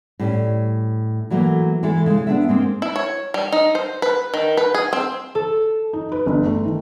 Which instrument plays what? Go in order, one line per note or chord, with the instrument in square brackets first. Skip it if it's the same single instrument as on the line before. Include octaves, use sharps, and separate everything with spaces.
[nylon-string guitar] A2 G3 C#4
E3 F#3 A3 A#3
E3 G#3 E4 A4
C#3 G#3
B3 D4 E5
G#3 A#3 C4
[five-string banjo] E4
C#5
G3
D#4
C5
B4
D#3
B4
G#4
C4
[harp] A4
[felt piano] D#4
B4
G1
A3
D#3